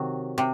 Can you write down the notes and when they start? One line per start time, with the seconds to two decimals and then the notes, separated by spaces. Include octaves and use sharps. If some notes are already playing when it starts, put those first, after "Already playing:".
Already playing: C3 D#3 F#3
0.38 C3